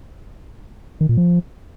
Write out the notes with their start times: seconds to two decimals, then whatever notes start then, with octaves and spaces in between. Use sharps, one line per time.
1.01 D#3
1.09 A#2
1.17 F3